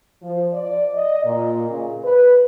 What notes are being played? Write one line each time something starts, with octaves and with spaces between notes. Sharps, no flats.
F3
D5
D#5
A#2
C#3
B4